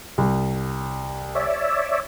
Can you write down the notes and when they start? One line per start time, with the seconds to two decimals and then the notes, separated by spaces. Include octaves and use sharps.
0.18 C2
1.35 C#5 D5 E5